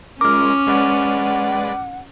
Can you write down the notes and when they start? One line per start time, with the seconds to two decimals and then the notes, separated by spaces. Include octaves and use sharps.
0.21 G#3 C#4 F4 A#4 D6 F6
0.67 G#3 B4 D5 F#5